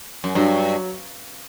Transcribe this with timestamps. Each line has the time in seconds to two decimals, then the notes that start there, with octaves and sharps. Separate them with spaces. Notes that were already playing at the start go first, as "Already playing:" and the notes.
0.24 F#2
0.35 G2 F#3